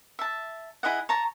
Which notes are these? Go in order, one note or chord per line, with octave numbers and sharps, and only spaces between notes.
E5 A5
E4 G#4 D#5 F#5
C#5 A5 A#5